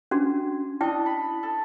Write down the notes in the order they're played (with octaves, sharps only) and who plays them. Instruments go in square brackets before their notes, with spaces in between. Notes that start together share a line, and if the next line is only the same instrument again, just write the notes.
[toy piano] C#4 D4 F#4
[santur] D4 D#5 [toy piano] E4 G5
[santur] B5
A4